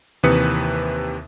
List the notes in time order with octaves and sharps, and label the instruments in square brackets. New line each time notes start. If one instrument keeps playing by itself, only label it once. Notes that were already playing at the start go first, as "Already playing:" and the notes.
[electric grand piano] D#2 C3 E3 B4 D#6 C#7